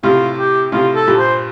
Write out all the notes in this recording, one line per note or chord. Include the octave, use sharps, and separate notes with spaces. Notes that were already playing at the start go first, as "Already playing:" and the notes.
A2 C3 F4
G4
A2 C3 F4
A4
G2 A#2
C5